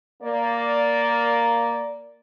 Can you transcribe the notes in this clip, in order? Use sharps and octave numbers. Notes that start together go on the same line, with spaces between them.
A#3 D5